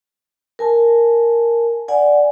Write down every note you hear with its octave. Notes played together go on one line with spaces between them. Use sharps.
A#4 G#5 A5
D5 F#5 G#5